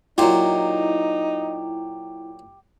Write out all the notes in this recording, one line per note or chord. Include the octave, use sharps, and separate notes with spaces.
A#2 F#3 D#4 E4 G4 C6